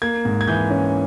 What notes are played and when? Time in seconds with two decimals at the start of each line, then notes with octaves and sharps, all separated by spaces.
0.02 A#3 G#6
0.25 G#2
0.41 G#6
0.48 E3 G6
0.70 C#4